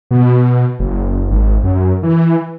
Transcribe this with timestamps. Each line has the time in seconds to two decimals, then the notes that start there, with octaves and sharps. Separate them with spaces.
0.11 B2
0.80 F#1
1.30 G#1
1.63 F#2
2.03 E3